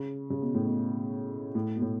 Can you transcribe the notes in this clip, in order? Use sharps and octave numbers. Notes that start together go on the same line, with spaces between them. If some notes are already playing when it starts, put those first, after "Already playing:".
Already playing: C#3
C#3
B2
A2
B2
A2
B2
A2